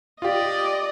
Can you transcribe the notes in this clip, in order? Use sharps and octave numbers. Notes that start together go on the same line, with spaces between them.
F4 G4 D5 D#5